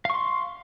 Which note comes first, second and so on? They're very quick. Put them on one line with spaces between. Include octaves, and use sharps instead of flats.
F5 C#6 C6